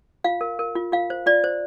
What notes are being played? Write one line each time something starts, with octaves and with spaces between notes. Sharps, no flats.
F4 F5
A#4
A#4
F4
F4 F5
C5
F4 D5
C5